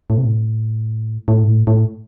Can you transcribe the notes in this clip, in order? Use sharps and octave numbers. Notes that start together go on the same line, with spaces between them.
A2
C3
A2
A2
G#2
A2
A2